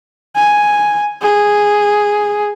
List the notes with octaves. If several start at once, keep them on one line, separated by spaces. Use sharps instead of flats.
G#5
G#4